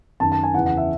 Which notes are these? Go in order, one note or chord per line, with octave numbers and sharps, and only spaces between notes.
F#2 D#3 A5
A5
G#5
E2 C#3 E3 F#5
F#5
E5